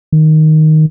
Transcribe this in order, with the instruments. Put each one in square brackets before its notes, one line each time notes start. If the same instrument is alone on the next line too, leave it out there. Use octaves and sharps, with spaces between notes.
[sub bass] D#3